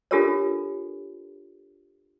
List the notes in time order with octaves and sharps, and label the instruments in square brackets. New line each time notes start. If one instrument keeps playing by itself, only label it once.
[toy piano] D4 F4 G4 A4 A#4 C#5